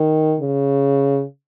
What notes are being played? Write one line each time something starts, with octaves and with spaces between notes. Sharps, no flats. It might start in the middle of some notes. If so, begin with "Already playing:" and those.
Already playing: D#3
C#3